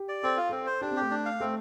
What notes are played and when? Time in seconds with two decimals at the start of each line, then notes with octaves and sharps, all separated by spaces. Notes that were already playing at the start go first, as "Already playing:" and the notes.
Already playing: G4
0.09 D5
0.23 C4 A4
0.37 F4
0.49 C4 A4
0.66 C5
0.81 D4 G4
0.91 C4
0.96 G4
1.01 A3
1.11 D4
1.26 F5
1.40 A3 C4